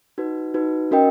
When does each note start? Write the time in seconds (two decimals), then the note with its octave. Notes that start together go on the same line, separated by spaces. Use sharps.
0.18 D#4 F#4 B4
0.54 D#4 F#4 B4
0.91 C#4 F#4 A#4 D#5 G5